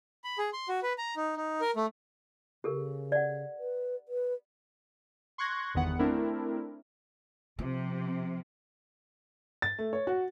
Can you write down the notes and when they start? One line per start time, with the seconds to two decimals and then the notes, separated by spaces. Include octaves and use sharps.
0.24 B5
0.38 G#4
0.53 C6
0.68 F#4
0.83 B4
0.98 A#5
1.16 D#4
1.36 D#4
1.61 A#4
1.76 A3
2.64 C#3 G4 A4 A#4
3.12 D5 F#5
3.59 B4
4.09 B4
5.38 C6 C#6 F#6 G#6 A#6
5.74 G1 E2 D#3 B3 F#5
5.99 A3 C4 D4 E4 A#4
7.59 C3 F3
9.62 A6
9.79 A3
9.93 C#5
10.07 F#4